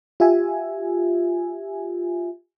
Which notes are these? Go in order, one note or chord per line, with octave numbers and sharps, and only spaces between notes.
F4 G4 E5 G#5